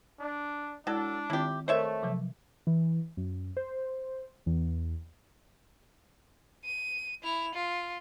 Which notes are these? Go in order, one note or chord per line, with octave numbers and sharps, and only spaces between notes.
D4
F#3 G#3 D4 E4 A4
D#3 C4 E4 F4 G4
A3 A#4 C5 C#5 D#5 E5
C3 F3 F#3
E3
F#2
C5
E2
D#7
E4 F7
F4